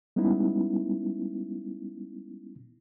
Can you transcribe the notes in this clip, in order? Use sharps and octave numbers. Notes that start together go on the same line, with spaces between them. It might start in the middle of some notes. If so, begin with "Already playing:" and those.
G3 G#3 B3 C#4 D#4 E4